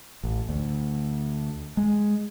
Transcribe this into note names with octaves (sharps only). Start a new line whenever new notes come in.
A1
D2
G#3